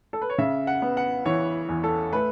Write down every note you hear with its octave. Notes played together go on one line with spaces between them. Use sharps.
A4
B4
C#5
C#3 E5
F#5
B3
F#5
E3 C#5
E2
A4
A3 B4